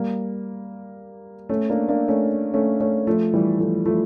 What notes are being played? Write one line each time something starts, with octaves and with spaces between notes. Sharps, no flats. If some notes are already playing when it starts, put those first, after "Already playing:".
Already playing: G3 A#3
A3 C#4
A#3 D4
A#3 D4
A3 C#4
A3 C#4
A3 C#4
F3 A3
E3 G3
F3 A3
F3 A3